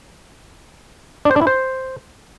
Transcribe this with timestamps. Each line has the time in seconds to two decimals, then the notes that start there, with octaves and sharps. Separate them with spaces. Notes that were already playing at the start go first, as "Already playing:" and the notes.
1.25 D4
1.31 C5
1.36 D4
1.41 E4
1.47 C5